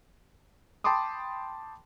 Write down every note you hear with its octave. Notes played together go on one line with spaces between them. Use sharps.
G5 A5 B5 C6 D6 D#6